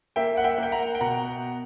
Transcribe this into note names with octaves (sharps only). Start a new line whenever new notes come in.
A#3 E5 G5
F#5
E5 G5
A#3 G5
F#5 A#5
G5
B2 F#5 A#5